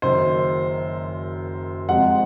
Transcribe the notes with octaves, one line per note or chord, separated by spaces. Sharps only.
F#1 F#2 D#3 C5
F1 F2 C3 F3 G#3 F#5